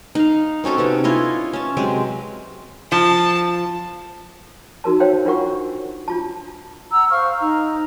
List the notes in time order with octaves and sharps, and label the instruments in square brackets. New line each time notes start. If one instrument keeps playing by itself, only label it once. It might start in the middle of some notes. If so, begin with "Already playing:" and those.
[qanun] D#4 F5
C4 C#4 F#4 A4
C3 B3 C#4
E4 F4 C#5 D#5
C#4 A5
C3 F#3 G#3 C4
[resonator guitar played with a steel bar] F3 [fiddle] A5
[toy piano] D#4 F#4 A#4 A5
C5 C#5 F5 G5
D4 F4 A#4 F#5 C#6
D4 F4 A5
[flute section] F#5 A#5 E6
C5 F5 C#6 F6
D#4 A#5